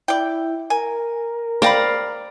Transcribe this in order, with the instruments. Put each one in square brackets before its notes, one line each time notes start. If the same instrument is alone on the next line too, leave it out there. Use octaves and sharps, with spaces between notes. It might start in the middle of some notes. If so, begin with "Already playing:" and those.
[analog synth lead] E4 [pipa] D5 G5
[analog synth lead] A#4 [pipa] G#5
[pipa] C5 G5 B5 [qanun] D5 F5 A#5